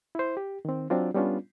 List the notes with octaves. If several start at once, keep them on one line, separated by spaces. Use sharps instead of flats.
E4 C5
G4
D#3 C4
F#3 C4 D4 F4
G3 B3 C#4 D4 F4